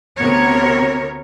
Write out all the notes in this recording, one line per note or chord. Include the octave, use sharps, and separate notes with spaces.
D2 C3 B3 A#4 C#5